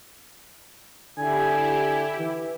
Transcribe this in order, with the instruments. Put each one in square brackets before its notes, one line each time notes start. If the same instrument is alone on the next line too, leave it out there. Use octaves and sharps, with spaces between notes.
[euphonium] D3 [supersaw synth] E4 G4 [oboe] G#5
[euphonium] E3